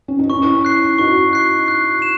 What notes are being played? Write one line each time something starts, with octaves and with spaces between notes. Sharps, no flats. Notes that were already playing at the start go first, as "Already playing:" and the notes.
C#4
D#4
C#4 E4 C#6
F#6 C7
D#4 F#4 C#6
F#6 C7
F#6
E7